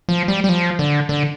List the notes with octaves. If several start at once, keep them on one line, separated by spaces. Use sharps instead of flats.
F3
G3
G3
F3
D3
D3